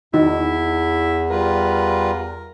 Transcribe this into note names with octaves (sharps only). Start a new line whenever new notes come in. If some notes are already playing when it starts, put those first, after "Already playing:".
E2 D#3 D#4 E4 F#4
G3 F4 A#4 B4